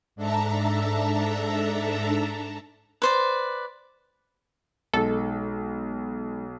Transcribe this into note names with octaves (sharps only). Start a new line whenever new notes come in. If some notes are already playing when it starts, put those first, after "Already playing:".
G#2 D4 A4 E5 A5 A#5
B4 C5 D5
B1 G#3 D#4 A4